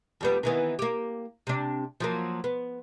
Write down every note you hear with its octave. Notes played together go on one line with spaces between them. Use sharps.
F2 G3 B3
D#3 E3 B3
A#3 G4
C3 D4
F3 F#3 A#3
B3